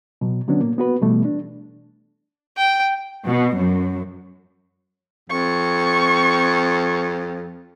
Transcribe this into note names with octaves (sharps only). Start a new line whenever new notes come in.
B2 F#3
D3 F#3 B3 C#4 D4
A#2 A#3
B3 F#4 B4
B2 E3 G3 A3 B3
D4
G5
B2
F#2
F2 C#6